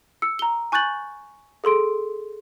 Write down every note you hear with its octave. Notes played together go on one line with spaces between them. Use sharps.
E6 C#7
A#5 G7
G#5 C#6 F#6 G6 A6 F#7
G#4 A4 C6 D7